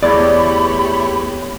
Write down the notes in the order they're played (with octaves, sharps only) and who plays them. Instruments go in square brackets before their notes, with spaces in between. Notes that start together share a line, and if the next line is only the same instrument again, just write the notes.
[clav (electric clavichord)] E2 [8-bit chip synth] A3 G4 C#5 [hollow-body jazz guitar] D5 [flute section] B5